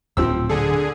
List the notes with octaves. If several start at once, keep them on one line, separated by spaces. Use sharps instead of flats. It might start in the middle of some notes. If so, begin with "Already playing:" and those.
D1 D2 A#2 F3 C4 E6
D3 G#4 A4